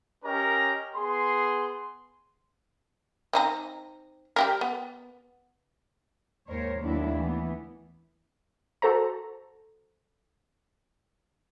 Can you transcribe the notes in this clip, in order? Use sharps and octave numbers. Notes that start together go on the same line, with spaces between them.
C#4 G4 A#4 D#5 A#5
B3 G#4 C6
C4 D#4 A#5
G3 G4 A#4
B3
D#2 G#2 A#4 C5 C#5
D#2 F#3 A3 B3 D4 E4
E3 B3
F#4 A4 C5 A#5